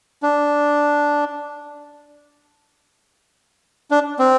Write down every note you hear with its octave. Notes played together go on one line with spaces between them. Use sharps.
D4
D4
C4